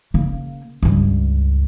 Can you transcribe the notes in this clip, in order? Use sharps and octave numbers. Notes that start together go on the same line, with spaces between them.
C#3 A#3
C#2 G2